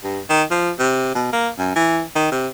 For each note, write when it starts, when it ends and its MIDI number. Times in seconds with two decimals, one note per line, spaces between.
0.04 0.20 43
0.29 0.43 51
0.50 0.71 53
0.79 1.11 48
1.15 1.30 47
1.33 1.49 58
1.58 1.75 42
1.76 2.01 52
2.15 2.30 51
2.31 2.48 48